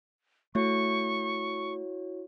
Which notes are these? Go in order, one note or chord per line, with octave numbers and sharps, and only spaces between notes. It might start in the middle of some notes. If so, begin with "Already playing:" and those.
A3 E4 F#4 C#5 C#6